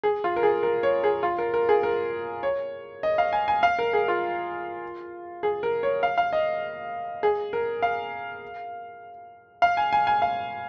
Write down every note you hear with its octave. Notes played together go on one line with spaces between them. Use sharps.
G#4
F4
A#4
G#4
A#4
C#5
G#4
F4
A#4
A#4
G#4
A#4
C#5
D#5
F5
G#5
G#5
F5
A#4
G#4
F4
G#4
A#4
C#5
F5
F5
D#5
G#4
A#4
F5
F5
G#5
G#5
G#5
F5